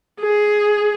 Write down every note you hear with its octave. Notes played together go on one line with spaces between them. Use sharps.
G#4